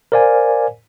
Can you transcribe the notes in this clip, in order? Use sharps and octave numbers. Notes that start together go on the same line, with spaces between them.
A#4 C5 D5 F5 G#5